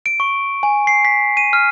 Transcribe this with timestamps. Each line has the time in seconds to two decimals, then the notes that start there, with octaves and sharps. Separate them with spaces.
0.06 D7
0.20 C#6
0.63 G#5
0.87 C7
1.05 B6
1.37 D#7
1.53 F6